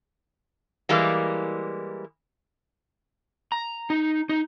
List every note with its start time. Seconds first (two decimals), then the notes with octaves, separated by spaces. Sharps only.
0.89 E3 G3 G#3 A#3
3.52 A#5
3.90 D#4
4.29 D#4